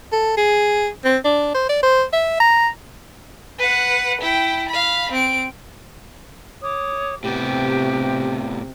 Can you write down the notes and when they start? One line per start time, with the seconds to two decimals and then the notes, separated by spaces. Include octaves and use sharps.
0.12 A4
0.37 G#4
1.04 C4
1.25 D4
1.54 C5
1.69 D5
1.83 C5
2.13 E5
2.40 A#5
3.58 B4 F#5
4.21 E4 G5
4.69 F5 B5
5.12 C4 D7
6.62 C#5 D6 D#6
7.24 A2 C3 B3 G4